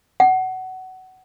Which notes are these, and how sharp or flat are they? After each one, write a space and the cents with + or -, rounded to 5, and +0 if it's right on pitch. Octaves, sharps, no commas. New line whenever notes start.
F#5 +20